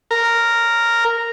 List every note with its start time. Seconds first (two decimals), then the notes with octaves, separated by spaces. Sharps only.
0.11 A#4